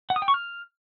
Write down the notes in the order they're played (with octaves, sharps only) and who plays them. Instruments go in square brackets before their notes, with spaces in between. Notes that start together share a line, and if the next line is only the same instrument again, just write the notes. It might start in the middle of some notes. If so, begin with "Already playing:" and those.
[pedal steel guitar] F#5
D#6
G5
C#6
F6